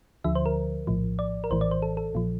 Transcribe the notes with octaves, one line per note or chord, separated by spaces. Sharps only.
D2 D3 F3 E5
C5
A#4
A#1 A2 F3
D5
A#4
A#1 A2 E3 C5
D5
C5
A4
A4
A#1 A#2 F3